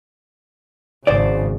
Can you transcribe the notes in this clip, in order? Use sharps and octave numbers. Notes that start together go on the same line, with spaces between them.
G#1 C#3 C5 D5